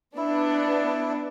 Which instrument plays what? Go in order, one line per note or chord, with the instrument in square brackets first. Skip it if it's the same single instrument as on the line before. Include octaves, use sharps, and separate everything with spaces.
[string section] B3 D4 [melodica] E4